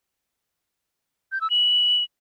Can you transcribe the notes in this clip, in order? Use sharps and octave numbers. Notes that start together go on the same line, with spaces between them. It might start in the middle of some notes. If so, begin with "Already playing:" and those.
G6
E6
F#7